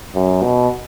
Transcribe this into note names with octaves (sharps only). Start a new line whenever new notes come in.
F#2
B2